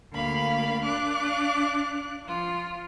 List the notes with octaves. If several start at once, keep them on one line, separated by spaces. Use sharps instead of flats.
D2 A#3 F5 B5
D4 F5 D6 F#6
F3 F4